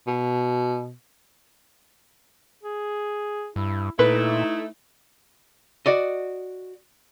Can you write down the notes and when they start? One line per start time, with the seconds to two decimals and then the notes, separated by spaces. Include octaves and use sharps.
0.07 B2
2.63 G#4
3.56 G2 E4
3.99 A#2 A3 D#4 E4 B4
5.86 F#4 D5 D#5